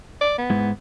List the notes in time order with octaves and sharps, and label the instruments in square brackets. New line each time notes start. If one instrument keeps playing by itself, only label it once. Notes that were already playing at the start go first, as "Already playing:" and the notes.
[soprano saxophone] D5
B3
[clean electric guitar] G#2 G#3 E4